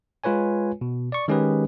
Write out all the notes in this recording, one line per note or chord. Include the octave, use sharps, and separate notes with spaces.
G#3 F4 B4 C#5 G#5
B2
D5 C#6
D#3 G#3 C#4 G4 G#4 B4